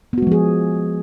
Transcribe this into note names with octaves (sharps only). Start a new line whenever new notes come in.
F3 G#3 B3 F#4 G#4